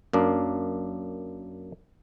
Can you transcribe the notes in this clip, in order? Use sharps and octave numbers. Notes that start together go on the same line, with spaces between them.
F#2 A#3 D4